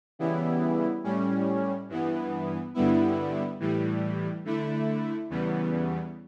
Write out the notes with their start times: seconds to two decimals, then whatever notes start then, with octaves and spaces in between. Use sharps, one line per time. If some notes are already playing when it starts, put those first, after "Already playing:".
0.19 C#3 E3 G3 B3 E4
1.04 A2 G3 C#4
1.89 G2 E3 B3
2.74 G2 D3 G3 B3 E4
3.60 A2 E3 G3
4.45 D3 A3 E4
5.30 E2 C#3 E3 G3 B3